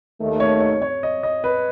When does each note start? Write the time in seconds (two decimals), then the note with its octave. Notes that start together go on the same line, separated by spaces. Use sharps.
0.20 D#2 D#3 A3
0.40 C#5
0.60 C#5
0.82 C#5
1.03 D#5
1.23 D#5
1.44 B4